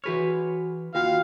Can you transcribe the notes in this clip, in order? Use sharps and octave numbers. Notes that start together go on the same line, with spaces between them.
E3 F#4 G#4 B4 C#5 F6
D#2 F4 F#4 F5 G5